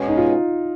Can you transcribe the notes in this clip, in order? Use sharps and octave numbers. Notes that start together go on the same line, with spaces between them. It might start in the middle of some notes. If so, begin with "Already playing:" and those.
Already playing: B2 G#3 C#4
D#4
F4